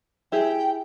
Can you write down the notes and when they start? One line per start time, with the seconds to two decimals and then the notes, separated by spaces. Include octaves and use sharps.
0.32 E4 G4 G#4 G5